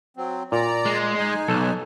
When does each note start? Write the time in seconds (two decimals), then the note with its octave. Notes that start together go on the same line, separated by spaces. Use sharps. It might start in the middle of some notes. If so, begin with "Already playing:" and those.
0.17 F#3 C4
0.52 A#2 D5 A#5
0.85 G#3
1.17 D#4 G#5
1.48 B1 A4